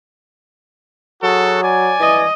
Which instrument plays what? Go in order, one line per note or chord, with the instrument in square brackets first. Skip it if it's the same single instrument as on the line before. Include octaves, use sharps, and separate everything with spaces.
[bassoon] F#3 [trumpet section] F#4 G#4 A4
[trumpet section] D5 G#5
[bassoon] E3 [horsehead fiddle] D#5